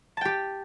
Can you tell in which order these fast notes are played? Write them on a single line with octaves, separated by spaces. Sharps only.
A5 G5 G4